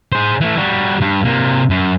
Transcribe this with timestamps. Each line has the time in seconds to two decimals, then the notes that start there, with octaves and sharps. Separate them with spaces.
0.12 G#4 C5
0.41 E3 A3
0.57 G3 F#4
1.01 G2
1.25 C3 A#3
1.70 F#2